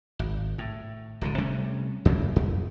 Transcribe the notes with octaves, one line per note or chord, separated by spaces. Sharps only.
G#1
A2
D1 C#2 D3
C3 G3 A3 C#4
E2 C#3 E3 A#3
F2